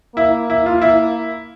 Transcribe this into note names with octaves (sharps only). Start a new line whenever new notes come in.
A#3 E4
E4
F4
E4